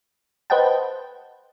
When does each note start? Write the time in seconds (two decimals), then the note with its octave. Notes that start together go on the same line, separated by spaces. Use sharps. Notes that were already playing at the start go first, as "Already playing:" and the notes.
0.50 B4 C5 D#5 F#5 G5 A5